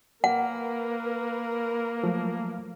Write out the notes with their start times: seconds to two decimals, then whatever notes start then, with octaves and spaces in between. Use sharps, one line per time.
0.24 A#3 A#4 B4 F#5
2.04 F3 F#3 A3